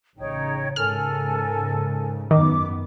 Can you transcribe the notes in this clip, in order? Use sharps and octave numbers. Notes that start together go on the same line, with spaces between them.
A1 C#3 D#4 C#5 G5
G#2 C#3 A4 A#4 G#5 F6
F#2 D#3 B3 D6